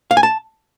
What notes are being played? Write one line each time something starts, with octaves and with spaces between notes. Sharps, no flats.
F5
G#5
A5